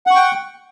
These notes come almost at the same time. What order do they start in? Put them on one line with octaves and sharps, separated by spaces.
F#5 C#6 G5